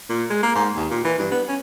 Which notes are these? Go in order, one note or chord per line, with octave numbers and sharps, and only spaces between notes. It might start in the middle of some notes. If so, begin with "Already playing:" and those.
A#2
G#3
A#3
G#2
D#2
A#2
E3
G2
B3
C#4